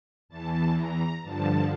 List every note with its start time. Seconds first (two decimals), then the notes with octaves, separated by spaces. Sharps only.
0.29 E2 E3 A5
0.75 A#5
1.22 G2 D3 F3 A5